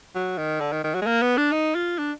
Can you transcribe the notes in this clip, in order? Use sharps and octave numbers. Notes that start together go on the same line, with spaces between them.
F#3
D#3
D3
D#3
D#3
F#3
G#3
A#3
B3
D4
D#4
F4
D4